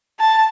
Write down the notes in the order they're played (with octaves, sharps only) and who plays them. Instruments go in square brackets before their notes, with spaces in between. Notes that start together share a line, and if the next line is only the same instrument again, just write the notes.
[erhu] A5